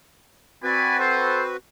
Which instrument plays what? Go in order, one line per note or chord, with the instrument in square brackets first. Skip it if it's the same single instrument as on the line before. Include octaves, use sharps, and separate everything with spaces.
[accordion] C4 F#4 B4 [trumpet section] D5 G#5 B5
[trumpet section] A4 C5